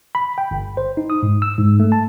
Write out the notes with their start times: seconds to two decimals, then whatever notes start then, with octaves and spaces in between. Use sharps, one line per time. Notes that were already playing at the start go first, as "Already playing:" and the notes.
0.15 B5
0.38 G5
0.51 G1
0.77 C5
0.97 D#4
1.10 D#6
1.23 G#2
1.42 E6
1.58 G#2
1.80 A3
1.92 A5